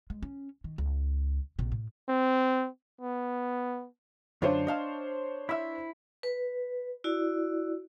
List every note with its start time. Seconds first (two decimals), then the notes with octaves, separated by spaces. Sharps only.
0.10 G#3
0.23 C#4
0.64 D#3
0.78 C#2
1.59 A#1 C3
1.72 A2
2.09 C4
3.01 B3
4.42 F#2 D3 D4 F4 C5 C#5
4.67 D#5 F5 A5
5.49 E4 E5
6.23 B4
7.04 E4 F#4 D5